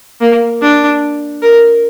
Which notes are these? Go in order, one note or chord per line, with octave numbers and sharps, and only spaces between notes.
A#3
D4
A#4